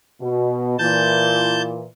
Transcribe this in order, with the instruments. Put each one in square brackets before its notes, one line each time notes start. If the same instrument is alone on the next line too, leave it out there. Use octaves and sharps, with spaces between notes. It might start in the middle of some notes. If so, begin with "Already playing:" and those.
[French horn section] B2
[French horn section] A#2 E3 [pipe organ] A5 G6